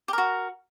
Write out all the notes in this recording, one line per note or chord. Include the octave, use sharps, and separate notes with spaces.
F#4 G4 A#4